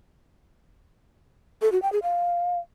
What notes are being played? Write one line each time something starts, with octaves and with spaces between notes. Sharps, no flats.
A4
F#4
G5
G#4
F5